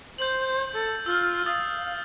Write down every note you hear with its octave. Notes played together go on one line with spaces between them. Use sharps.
C5 G6 F#7
A4
F4 E6 F6
F5 D#6 E6 A6